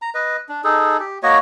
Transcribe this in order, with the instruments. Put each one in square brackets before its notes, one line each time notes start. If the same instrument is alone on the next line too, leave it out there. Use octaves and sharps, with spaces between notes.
[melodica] A#5
B4 D#5
D4
D#4 G#4 A4
G4
A#3 F#4 C#5 D#5